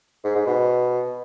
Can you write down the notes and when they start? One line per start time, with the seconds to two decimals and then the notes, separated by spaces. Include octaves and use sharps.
0.25 G#2
0.35 G#2
0.46 B2